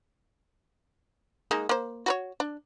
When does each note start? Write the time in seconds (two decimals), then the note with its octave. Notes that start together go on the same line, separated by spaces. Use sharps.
1.51 G#3 A#3 D#4
1.69 A#3 C5
2.06 F#4 B4 C#5
2.40 D4